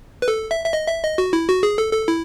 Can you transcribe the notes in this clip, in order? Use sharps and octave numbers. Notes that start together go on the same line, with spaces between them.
B4
A4
E5
E5
D#5
E5
D#5
F#4
E4
F#4
G#4
A4
A4
E4